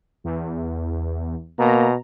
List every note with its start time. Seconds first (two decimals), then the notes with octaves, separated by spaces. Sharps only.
0.24 E2
1.59 B2 A#3 A#5